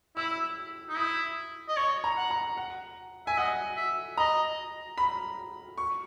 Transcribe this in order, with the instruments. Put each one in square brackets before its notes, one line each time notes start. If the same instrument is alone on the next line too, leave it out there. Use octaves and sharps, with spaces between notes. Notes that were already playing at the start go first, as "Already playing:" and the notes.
[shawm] E4 [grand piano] E6
[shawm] D#4
[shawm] E4 [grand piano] D#6
[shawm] D#5
[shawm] C#5 [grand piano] C#6
[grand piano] A#5
[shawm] F#5
[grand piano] A#5
F#5
[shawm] E5 [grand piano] G#5
[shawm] D#5 [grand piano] F#5
[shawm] E5
[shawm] D#5 [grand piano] A#5
[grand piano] B5
C#6